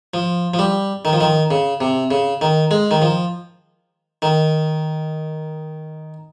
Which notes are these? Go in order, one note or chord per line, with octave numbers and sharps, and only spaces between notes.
F3
F3
G3
D#3
F3
D#3
C#3
C3
C#3
D#3
G#3
D#3
F3
D#3